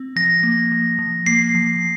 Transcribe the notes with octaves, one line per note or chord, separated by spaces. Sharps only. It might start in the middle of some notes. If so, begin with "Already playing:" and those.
Already playing: C4
F3 A#6
A#3
F3
F3
A#3 C7
F3